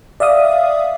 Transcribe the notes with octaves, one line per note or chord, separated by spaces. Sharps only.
D5 E5 F5 D#6